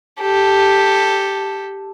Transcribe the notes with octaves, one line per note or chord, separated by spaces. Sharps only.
G4 A4